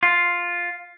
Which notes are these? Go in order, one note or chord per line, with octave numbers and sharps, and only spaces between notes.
F4